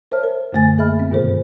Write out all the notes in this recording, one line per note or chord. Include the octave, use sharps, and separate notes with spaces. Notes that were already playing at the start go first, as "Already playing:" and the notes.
A#4 C5 C#5 E5 A5 F6
A#4
F#2 A#2 D3 A3 G#5 A6
A#3 G#4 D#5 E5 B5 F6
B3 C4
G2 B2 D#3 G#4 A#4 C5